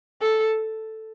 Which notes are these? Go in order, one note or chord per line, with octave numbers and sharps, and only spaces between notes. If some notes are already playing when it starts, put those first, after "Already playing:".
A4